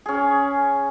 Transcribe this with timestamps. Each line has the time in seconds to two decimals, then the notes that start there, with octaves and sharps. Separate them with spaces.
0.06 C#4 G#4